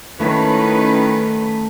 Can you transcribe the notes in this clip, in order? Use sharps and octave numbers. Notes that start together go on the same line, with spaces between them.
D#3 A3 C#4 E4 B4 C#5